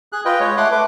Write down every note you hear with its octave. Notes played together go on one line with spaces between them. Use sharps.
G#4 F#6
F4 B4 D#5 G5
G#3 C#5
A3 F#5 C6 D6 F#6
A3 B4 D6